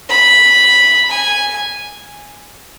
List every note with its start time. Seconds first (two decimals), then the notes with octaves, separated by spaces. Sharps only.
0.09 B5
1.10 G#5